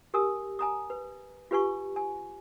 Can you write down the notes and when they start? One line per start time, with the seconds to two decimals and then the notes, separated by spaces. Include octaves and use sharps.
0.14 G4 A#4 G#5 D#6 E6
0.59 G#5 A#5 D#6
0.90 B4
1.51 F4 G4 B4 G#5 C#6
1.96 G#5